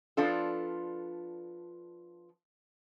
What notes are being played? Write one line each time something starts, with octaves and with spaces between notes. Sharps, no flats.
F3 B3 D4 F4 A4